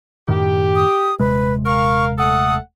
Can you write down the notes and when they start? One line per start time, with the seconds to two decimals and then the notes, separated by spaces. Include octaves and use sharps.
0.28 F#2 A2 D#3 G4
0.76 D#6
1.19 D#1 C3 G#3 B4
1.66 A#4 F5 C#6
2.18 A3 A4 F#5 D#6